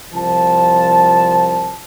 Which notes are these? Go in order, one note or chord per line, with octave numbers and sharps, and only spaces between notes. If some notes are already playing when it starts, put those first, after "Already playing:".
C2 F3 A5